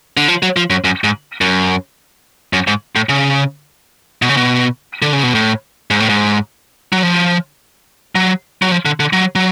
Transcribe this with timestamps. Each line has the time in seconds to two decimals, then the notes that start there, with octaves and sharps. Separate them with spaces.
0.17 D3
0.28 F3
0.43 F#3
0.56 F3
0.70 F#2
0.84 F#2
1.04 G#2
1.41 F#2
2.53 F#2
2.67 G#2
2.96 A2
3.09 C#3
4.22 B2
4.29 C#3
4.37 B2
5.02 D3
5.13 C#3
5.23 B2
5.35 A2
5.91 G#2
6.00 A2
6.09 G#2
6.93 F#3
7.03 F3
8.15 F#3
8.62 F#3
8.71 F3
8.85 D3
9.00 D3
9.13 F#3
9.35 F#3